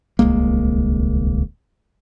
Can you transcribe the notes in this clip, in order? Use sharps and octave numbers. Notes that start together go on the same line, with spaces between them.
D1 C2 G#3 A#3